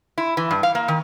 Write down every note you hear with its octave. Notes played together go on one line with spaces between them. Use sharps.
E4
E3
G2
F5
A#3
D#3